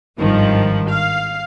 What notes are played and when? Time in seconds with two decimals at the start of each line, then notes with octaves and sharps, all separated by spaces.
0.19 G#1 G2 D#3 F3
0.89 F5